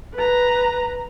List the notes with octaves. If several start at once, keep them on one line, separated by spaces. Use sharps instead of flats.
B4 A#5